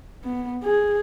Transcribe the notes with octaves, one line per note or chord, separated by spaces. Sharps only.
B3
G#4